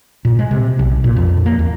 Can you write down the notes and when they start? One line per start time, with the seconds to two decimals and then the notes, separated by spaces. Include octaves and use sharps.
0.25 A#2
0.39 G#3
0.51 C3
0.79 B1
1.04 A#2
1.17 F2
1.46 A#3
1.59 E2